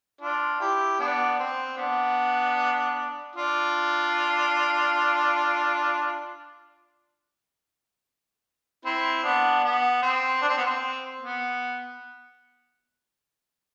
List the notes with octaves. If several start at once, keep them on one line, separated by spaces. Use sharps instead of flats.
D4 F4
E4 G4
B3 D4
C4
B3 D4
D4 F4
C4 E4
B3 D4
B3
C4
D4
C4
B3
C4
B3